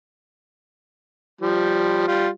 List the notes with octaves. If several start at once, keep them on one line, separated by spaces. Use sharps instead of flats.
F3 G3
G3 F4